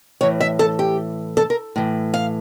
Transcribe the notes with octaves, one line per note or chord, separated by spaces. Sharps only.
A2 E3 C#5
E5
A4
G4
A4
A#4
A2 E3
F5